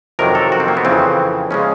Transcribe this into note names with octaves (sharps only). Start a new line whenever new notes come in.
F2 C3 D#3 F#3 A#4
A4
F#4
C4
A#3
B3
F2 C#3 E3 C4
C#3 F3 G#3 C#4